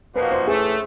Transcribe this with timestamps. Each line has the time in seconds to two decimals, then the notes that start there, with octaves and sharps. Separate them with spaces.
0.15 A#2 F3 A#3 D#4 F#4 B4
0.32 C5
0.47 A2 E3 A3 G#4